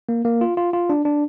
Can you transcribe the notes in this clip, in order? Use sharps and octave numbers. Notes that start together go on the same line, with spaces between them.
A#3
A#3
F4
F4
F4
D4
D4